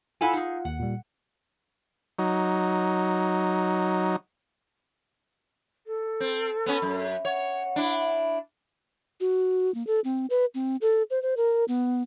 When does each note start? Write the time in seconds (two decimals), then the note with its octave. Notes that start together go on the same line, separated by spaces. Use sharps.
0.21 E4 F4 A4 F5 F#5 G#5
0.33 D#4 G#4
0.65 D#2 F#5
0.79 A#2 G3
2.19 F#3 D#4
5.86 A4
6.20 C4
6.66 B3 C#4
6.82 F#2
7.25 C#5 F#5
7.76 D4 E4
9.20 F#4
9.75 A#3
9.87 A4
10.04 C4
10.30 B4
10.55 C4
10.81 A4
11.10 C5
11.22 C5
11.37 A#4
11.68 B3